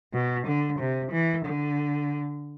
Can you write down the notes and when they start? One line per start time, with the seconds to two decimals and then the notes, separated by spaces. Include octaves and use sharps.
0.13 B2
0.46 D3
0.79 C3
1.11 E3
1.45 D3